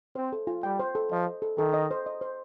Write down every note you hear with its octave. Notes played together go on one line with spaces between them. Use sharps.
C4 C5
A4
F4
G3 G5
C5
A4
F3 D#5
C5
A4
D#3 A4
D#5
C5
D#5
C5